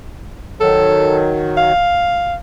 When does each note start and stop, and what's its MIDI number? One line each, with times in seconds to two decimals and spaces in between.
0.61 1.72 51
0.61 1.72 54
0.61 1.19 69
1.58 2.36 77